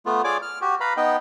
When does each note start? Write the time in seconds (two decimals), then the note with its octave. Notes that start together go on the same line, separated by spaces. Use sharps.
0.06 A3 B3 F4
0.24 F4 G#4 C#5 D5 G#5 D6
0.42 F6
0.62 F#4 G4
0.80 B4 F5 A#5 B5
0.97 B3 D#4 D#5 G5